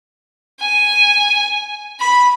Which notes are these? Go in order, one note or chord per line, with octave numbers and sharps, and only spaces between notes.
G#5
B5